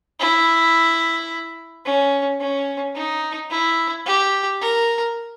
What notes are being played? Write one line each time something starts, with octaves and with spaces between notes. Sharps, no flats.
E4
C#4
C#4
D#4
E4
G4
A#4